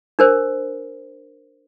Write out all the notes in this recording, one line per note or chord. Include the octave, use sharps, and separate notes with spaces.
D4 A#4 C5